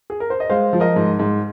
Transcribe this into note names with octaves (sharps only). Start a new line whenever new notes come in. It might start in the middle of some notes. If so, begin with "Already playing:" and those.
G#4
A#4
C5
D#5
G#3 C5 F5
F3
A#4 D#5
G#2
G#2